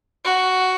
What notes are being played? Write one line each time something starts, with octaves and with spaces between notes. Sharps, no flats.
F#4